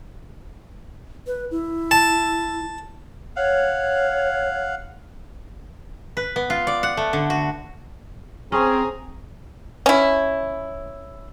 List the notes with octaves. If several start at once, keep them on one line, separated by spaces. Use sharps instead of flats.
B4
E4
A5
C#5 F5 F#5
B4
B3
F4
D5
F#5
A3
D3
F#4
C4 C#4 G#4 A#5
C#4 E4